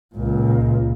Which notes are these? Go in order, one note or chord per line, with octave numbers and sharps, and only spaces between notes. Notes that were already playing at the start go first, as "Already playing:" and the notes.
C#2 A#2